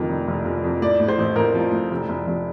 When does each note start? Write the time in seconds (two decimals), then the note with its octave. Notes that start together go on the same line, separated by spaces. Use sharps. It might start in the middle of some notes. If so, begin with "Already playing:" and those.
Already playing: F2 A2 D#3
0.08 F1
0.27 F1
0.45 F1
0.64 F2
0.82 A2 D5
1.00 A2
1.08 C5
1.18 A1
1.36 A1 A#4
1.54 F3
1.72 A2
1.91 F1
2.09 F1
2.27 F1